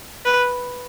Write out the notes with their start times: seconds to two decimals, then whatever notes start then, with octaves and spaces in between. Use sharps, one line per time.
0.25 B4